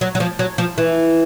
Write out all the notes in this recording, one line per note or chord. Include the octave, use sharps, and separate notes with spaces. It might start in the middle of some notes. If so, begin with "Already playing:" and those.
F#3
F#3
F3
F#3
F3
E3